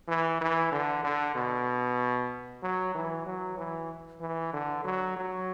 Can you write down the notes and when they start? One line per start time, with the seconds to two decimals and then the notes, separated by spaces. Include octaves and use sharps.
0.08 E3
0.41 E3
0.72 D3
1.04 D3
1.35 B2
2.62 F#3
2.95 E3
3.26 F#3
3.57 E3
4.20 E3
4.53 D3
4.84 F#3
5.16 F#3